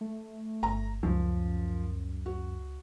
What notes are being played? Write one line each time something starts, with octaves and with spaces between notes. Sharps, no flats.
A3
G1 A#5
C#2 F#2 F3
F#4